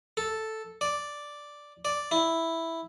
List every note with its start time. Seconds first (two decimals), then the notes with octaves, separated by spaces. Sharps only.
0.17 A4
0.81 D5
1.85 D5
2.11 E4